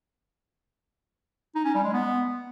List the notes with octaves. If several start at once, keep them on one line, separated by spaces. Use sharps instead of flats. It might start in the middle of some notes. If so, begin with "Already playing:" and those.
D#4
C#4
G3
G#3
B3